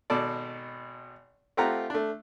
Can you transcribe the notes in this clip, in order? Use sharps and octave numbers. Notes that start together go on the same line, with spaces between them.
G#1 B2 A4 D5
A3 C4 F4 G4 F#5 A#5
A3 D4